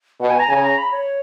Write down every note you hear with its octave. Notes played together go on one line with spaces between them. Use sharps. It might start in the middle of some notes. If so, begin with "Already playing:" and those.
B2 F#5
G#5
A#5
C#3 G#5
A#5
B5
C#5